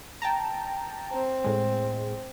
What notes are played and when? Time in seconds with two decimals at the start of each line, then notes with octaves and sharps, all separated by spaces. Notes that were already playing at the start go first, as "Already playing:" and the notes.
0.22 G5 A5 A#5
1.13 C4
1.44 A2 G#3